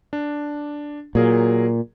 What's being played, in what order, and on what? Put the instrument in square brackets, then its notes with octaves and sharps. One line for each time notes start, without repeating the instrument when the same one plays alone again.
[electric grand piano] D4
[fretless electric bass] A#2 [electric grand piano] F#3 G#4 A#4